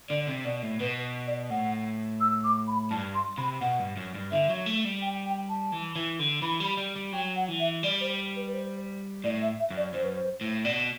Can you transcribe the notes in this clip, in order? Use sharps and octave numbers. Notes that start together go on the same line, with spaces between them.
D3 D5
C3
B2 D5
A2
B2 B4
D5
A2 F#5
E6
D6
B5
G2 A5
C6
C3 B5
B2 F#5
G2
F#2
G2
D3 E5
F#3
A3
G3
G5
G5
A5
E3
E3
D3
E3 B5
G3
G3
G3
F#3 G5
F#5
E3
E5
G3 D5
C5
B4
B4
C5
A2 D5
E5
E5
F#2
D5
F#2 C5
B4
C5
A2
B2 D5